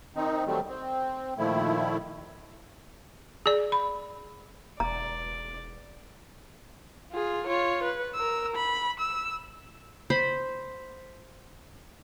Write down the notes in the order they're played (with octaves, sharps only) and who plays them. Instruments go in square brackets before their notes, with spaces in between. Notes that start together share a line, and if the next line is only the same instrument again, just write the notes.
[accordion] D#3 C4 D#4
D#3 F#3 G3 A3 C4
C4
A#2 D#3 F3 A3 E4
[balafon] G#4 D5
B5
[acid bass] E1 [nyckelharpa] D5 [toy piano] A#5
[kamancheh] F4 G#4
F4 C#5
B4
A#4 E6
B5
E6
[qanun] C5 B5